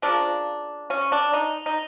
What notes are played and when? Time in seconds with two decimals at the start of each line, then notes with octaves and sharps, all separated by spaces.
0.02 C#3 F3 A#3 D4
0.90 C#4
1.12 D4
1.33 D#4
1.66 D#4